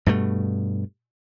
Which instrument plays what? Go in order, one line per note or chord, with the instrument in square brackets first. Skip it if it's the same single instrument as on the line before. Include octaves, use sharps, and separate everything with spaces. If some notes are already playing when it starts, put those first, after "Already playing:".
[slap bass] G2 B2 A3